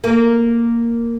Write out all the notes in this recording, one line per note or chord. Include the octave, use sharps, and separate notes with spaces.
A#3